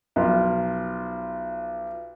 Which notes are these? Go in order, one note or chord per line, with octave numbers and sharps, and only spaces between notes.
B1 F3 F4